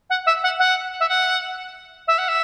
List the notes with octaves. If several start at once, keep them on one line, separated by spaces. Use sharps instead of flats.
F#5
E5
F#5
F#5
E5
F#5
E5
F#5
E5